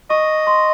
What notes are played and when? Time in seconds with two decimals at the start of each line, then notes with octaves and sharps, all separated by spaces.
0.10 D#5 C#6
0.47 C6